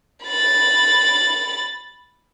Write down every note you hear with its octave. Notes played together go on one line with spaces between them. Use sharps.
B5 A6